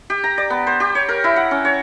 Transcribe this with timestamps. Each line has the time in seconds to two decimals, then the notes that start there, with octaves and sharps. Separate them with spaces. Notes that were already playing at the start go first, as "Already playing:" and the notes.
0.10 G4
0.24 A#5
0.38 D5
0.50 B3
0.67 C5
0.80 G4
0.95 C#5
1.09 A#4
1.24 E4
1.36 F#5
1.51 C#4
1.65 C#5